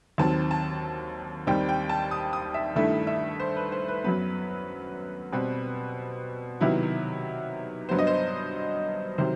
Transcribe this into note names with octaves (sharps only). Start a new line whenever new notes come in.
D#2 D#3 F#3 C4 A5
A5
D#2 D#3 G3 C4 G5
G5
A5
D#6
D#6
E5
G2 D#3 A3 E4 E5
E5
C5
B4
C5
B4
F#2 F#3 B3 B4
B2 G3 C4 B4
C3 D#3 F#3 B3 E4
G2 F#3 B3 C5
D#5
C5
C3 D#3 F#3 C5